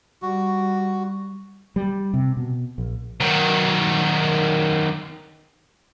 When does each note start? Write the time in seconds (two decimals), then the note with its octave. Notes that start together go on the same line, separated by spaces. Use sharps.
0.22 G3 F#4
1.76 G3
2.14 C3
2.37 B2
2.78 A#1
3.20 D#3 F#3